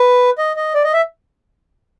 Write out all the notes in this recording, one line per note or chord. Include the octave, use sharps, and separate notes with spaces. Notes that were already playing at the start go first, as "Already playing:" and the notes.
Already playing: B4
D#5
D#5
D5
D#5
E5